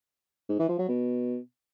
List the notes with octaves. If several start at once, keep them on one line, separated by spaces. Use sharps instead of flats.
G#2
E3
F3
F#3
B2